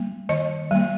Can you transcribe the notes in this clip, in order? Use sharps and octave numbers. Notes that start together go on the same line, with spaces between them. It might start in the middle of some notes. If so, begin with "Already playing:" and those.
Already playing: G3 A#3
D#3 D#5
G3 A#3